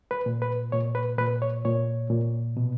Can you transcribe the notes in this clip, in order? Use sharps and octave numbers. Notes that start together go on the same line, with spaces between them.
B4
A#2
B4
A#2 C#5
B4
A#2 B4
C#5
A#2 C#5
A#2
B2